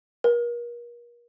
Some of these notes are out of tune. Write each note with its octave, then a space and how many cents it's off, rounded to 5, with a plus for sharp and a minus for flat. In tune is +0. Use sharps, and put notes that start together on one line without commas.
A#4 +35